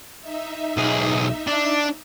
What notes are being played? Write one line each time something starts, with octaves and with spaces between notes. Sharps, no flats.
D#4 E5
B1 G#4
D4